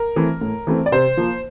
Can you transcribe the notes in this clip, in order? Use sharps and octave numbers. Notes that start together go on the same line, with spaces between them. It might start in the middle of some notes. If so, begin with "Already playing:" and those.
Already playing: A#4
E3 A3 C4
A2
E3 A3 C4
D5
C3 C5
F3 A#3